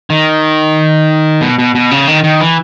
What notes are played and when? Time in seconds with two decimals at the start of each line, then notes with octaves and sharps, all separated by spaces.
0.10 D#3
1.41 B2
1.59 B2
1.75 B2
1.91 C#3
2.08 D#3
2.24 D#3
2.40 E3